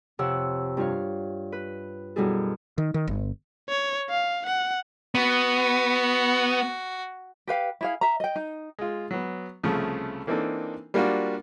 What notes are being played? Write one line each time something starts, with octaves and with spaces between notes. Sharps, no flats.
F2 C3 C#5 F#5 E6
G2 F4 C#5 F5
B4
F#2 B2 G3 E4 G#4 A4
D#3
D#3
G1
C#5
F5
F#5
B3 F#4
G4 B4 F5 G5
E4 G#4 F5
E5 A#5
D#5 G5
D#4
G#3 F4
F#3 B3
C2 C#3 F3 A3
E3 A#3 C4 D4 D#4 A4
G3 A#3 D4 F4 F#4